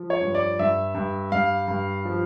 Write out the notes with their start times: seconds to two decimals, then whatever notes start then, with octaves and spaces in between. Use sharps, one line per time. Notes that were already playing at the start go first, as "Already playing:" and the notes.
Already playing: F3
0.10 C#5
0.22 G2
0.35 D5
0.59 G2 E5
0.95 G2
1.32 G2 F5
1.68 G2
2.05 F3